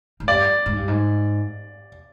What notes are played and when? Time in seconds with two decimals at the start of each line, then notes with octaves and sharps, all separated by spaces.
0.20 G#2
0.27 G2 D5
0.66 G#2
0.77 G2
0.88 G#2